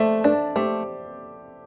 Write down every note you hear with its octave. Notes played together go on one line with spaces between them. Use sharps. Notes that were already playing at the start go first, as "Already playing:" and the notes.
Already playing: A3 C5 D5 E5
D4 A4 D5
A3 G4 C5